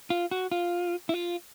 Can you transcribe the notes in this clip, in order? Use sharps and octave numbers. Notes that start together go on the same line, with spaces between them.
F4
F#4
F4
E4
F4